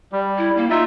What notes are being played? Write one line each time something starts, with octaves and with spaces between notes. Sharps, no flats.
G3
E4
A#3
D#4 F4 E5